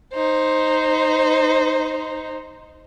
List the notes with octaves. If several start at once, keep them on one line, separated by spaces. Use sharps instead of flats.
D#4 C5